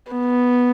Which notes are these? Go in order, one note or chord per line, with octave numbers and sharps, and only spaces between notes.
B3